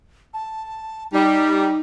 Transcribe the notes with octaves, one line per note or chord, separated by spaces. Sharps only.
A5
G3 D#4